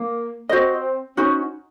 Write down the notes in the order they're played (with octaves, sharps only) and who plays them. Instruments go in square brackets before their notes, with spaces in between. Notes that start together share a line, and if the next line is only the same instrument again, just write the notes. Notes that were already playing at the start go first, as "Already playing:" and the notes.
Already playing: [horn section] A#3
[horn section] C4 [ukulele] F#4 C5 D#5
[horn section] C#4 [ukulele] D#4 F#4 C5